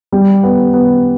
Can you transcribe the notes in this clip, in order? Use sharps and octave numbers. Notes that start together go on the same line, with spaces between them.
G3
B3
B3